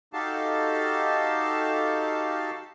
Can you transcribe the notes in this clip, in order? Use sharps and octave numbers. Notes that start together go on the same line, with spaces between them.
D#4 F#4 G4 A4 F5 A5